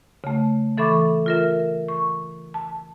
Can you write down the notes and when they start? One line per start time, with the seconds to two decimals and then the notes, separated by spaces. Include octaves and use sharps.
0.24 C#3 A3
0.78 E3 A4 E5 B5 C#6 D6
1.26 F4 A#4 E5
1.88 C#6
2.54 A5